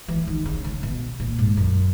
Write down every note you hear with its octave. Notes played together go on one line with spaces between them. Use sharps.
E3
D#3
C#3
C#3
B2
A#2
G#2
F#2